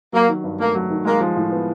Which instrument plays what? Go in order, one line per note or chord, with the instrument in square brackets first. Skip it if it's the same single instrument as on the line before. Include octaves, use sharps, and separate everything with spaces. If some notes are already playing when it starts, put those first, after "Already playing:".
[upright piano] F#3 [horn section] A#3
[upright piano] D#3
G2
[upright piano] A3 [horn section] A#3
[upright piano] F#3
D#3
[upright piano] G#3 [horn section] A#3
[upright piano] F3
A2
B3